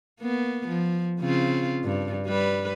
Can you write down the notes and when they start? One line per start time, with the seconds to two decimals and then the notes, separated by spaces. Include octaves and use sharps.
0.20 A#3 B3
0.68 F3
1.20 C#3 C4 F4
1.84 G2
2.27 G3 B4